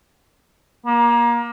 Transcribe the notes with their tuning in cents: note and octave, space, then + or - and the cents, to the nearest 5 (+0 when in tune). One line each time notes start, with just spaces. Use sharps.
A#3 +25